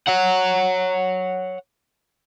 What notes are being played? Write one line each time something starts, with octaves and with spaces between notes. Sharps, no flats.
C#5 F#5